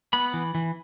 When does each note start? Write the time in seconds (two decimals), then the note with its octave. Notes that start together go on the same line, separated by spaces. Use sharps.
0.13 B3 B5
0.34 E3
0.55 E3